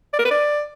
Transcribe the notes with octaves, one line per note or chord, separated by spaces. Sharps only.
D5
A#4
B4
D5